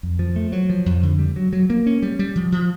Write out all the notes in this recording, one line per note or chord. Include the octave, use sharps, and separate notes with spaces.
F2
F3
A3
F#3
F3
F2
D3
G3
F#3
F#3
A#3
C#4
G3
G3
F3
F3